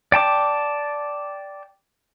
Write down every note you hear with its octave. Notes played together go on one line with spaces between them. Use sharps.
D5 G5 A5 D6